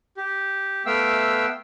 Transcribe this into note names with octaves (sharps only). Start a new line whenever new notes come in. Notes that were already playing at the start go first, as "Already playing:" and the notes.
G4
A3 B3 E5 F5 G5 E6